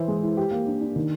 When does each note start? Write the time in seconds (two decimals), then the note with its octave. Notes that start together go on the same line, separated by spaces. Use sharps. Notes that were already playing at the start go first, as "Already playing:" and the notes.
Already playing: E3 E4 C5
0.08 G#3
0.23 E4
0.37 G4
0.51 A#3
0.67 D4
0.81 D4
0.96 D#3